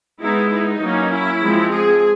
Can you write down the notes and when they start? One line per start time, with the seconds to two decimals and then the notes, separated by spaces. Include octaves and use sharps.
0.22 G#3 B3 D#4 E4
0.52 D#4
0.82 F#3 A#3 C#4
1.13 E4
1.42 F3 G#3 C4
1.71 G#4